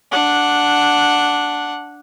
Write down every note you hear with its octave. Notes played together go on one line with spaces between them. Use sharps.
D4 F#5